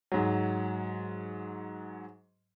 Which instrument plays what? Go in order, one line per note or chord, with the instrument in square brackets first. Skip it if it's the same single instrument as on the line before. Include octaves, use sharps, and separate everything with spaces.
[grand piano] G#2 F#3